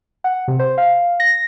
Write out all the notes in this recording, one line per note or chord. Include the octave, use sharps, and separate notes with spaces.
F#5
C3
C5
F5
A#6